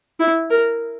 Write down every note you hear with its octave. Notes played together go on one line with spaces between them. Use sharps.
E4
A#4